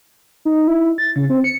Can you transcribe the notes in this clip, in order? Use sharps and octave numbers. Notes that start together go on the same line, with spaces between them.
D#4
E4
A6
C#3
C4
C#7